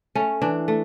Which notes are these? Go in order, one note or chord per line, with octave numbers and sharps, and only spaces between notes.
A3 C#4
E3 D4
A3